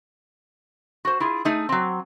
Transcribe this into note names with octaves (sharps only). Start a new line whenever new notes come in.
F#4 C5
E4 F4 G#4
A3 D#4 G#4
F#3 C4